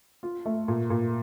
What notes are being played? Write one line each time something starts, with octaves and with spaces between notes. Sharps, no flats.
F4
A3
A#2
A#2